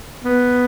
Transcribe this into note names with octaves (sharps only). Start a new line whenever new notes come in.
B3